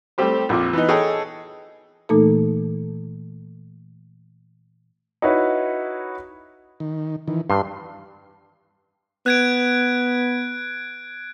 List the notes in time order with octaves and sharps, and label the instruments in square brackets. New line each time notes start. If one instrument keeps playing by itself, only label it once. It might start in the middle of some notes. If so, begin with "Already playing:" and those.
[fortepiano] G3 A3 C4 G4 C5
A#1 F2 F4 D6
E3 B3 D#4
G#4 A4 C#5 D#5 G5 G#5
[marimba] A#2 E3 A3 A#3 D#4 A4
[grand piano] D#4 E4 F#4 B4 C#5
[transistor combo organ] D#3
D#3 E3
[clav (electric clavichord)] G2 [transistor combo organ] C6
[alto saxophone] B3 [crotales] F#6 G#6 D7